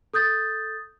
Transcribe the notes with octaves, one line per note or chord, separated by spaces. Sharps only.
A4 D#6 G6 A6